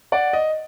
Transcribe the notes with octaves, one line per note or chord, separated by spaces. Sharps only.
D5 F#5
D#5